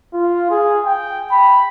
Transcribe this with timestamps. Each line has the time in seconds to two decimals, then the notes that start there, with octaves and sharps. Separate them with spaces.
0.13 F4
0.50 G#4
0.86 G5
1.31 B5